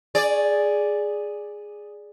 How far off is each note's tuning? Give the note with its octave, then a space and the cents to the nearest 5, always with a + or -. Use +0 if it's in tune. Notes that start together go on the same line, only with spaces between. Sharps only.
G#4 +0 D5 +0